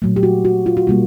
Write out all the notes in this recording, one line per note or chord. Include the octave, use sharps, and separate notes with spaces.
A#2 F#3 A3
G4
F#4
F#4
F4
F#4
B2 G3 A#3 F4